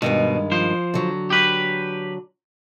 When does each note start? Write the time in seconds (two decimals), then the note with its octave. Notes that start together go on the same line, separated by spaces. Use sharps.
0.02 G2 B2 D#3 G#3
0.51 F3 C5
0.94 D3 F#3
1.30 G4 B4